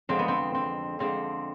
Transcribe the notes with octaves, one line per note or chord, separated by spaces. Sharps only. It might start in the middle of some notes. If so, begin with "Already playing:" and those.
F2 D3 G#3 C4
B3
C4
C4
F2 D3 G#3 C4